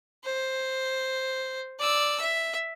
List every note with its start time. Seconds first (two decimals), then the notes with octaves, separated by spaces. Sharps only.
0.24 C5
1.79 D5 E6
2.21 E5